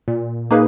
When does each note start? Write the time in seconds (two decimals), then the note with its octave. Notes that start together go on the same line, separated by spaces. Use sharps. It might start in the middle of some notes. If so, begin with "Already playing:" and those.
0.08 A#2
0.51 A#3 D#4 G#4 B4